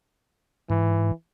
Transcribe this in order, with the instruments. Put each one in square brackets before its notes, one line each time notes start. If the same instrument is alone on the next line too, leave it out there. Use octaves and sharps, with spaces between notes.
[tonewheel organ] G#2 [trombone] E3